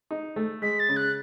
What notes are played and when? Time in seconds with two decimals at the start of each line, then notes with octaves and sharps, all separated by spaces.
0.11 D#4
0.36 A3
0.62 G#3 B6
0.80 A6
0.89 C#3
0.97 F#6